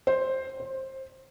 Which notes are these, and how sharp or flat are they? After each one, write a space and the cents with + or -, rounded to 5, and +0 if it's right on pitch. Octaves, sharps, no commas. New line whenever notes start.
C5 +5
C5 +20